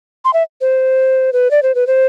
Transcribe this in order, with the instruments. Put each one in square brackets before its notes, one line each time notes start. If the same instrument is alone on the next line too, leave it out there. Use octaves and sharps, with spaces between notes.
[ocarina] C6
E5
C5
B4
D5
C5
B4
C5